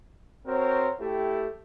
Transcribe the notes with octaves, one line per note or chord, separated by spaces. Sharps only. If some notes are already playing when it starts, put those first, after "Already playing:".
C4 F#4 A#4 C5 C#5
A3 E4 G4